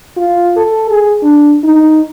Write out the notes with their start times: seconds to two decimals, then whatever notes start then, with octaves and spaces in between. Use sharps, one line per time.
0.17 F4
0.57 A4
0.91 G#4
1.23 D4
1.64 D#4